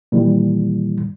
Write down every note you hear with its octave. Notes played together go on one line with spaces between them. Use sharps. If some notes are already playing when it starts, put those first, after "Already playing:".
A#2 D#3 E3 G3